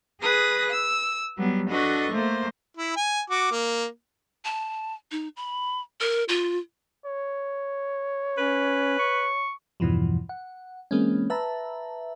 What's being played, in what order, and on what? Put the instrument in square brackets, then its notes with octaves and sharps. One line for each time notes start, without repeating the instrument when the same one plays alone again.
[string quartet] G#4 B4 D#6 A#6
E6
F#3 G3 B3
D4 F#4 A4 B4 D#5 C#6
A3 A#3 C5
[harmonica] E4
G#5
F#4 D6
A#3
[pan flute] A5
D#4
B5
A#4
F4
[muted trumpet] C#5
[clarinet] C#4 [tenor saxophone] B4
[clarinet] C#6
[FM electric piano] E2 G2 B2 E3 F3
F#5
E3 G#3 A#3 C4 C#4
B4 E5 A5 A#5